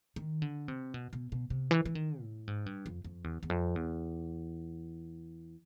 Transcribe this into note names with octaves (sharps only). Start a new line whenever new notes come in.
D#3
D3
C3
B2
B2
B2
C3
E3
E3
D#3
A2
G#2
G2
F2
F2
E2
E2
F2
E2